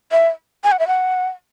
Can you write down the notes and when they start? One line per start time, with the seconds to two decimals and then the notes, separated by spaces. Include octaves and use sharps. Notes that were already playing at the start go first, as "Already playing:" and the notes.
0.12 E5
0.64 G#5
0.72 F#5
0.79 E5
0.87 F#5